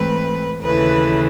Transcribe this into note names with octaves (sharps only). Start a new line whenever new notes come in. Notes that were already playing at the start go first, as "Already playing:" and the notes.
Already playing: G#2 E3 A3 C4 B4
D#2 C#3 E3 A3 B4